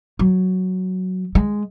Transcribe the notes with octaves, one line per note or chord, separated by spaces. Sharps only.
F#3
G#3